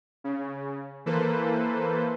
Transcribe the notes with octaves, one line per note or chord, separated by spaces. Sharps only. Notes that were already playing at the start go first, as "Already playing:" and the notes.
C#3
E3 A#3 A4 B4 C5